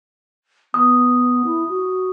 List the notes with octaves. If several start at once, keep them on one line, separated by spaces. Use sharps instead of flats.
B3 D#6
E4
F#4